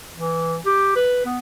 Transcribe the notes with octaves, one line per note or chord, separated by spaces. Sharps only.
E3
G4
B4
B3